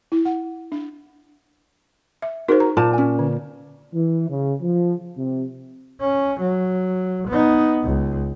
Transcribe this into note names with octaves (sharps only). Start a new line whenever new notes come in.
E4
F#5
D4
E5
D#4 F#4 G#4 A#4 C5
A#5
A#2 A5
C#4 G#5
D3
E3
C#3
F3
C3
C#4
F#3
B3 D#4
C#2